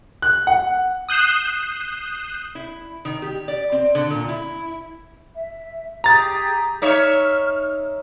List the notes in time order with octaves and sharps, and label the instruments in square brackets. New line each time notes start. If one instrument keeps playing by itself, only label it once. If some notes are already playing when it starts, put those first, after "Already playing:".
[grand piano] F#6
F#5
[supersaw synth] D#6 F#6 G6 C7 E7
[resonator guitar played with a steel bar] E4
D#3
G4
D5
C4
D3
A#2
E4
[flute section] E5
[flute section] G4 G#4 G5 [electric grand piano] A#5 A6
[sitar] D#4 C#5 E5 [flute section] F6